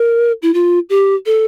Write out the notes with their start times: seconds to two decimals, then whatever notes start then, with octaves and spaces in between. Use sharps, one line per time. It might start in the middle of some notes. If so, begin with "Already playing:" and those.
Already playing: A#4
0.42 E4
0.54 F4
0.90 G4
1.26 A4